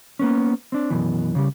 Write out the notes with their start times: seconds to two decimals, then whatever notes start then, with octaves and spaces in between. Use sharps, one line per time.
0.19 A#3 B3 C#4
0.72 C4 D4
0.90 F#2 B2 E3
1.35 C#3 G3